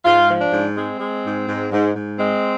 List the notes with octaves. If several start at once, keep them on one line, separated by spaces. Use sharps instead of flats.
G#2 F4
F3
D4
G#2
G#3 C4
G#3
G#2
G#2
G#2
G#2
G#3 C4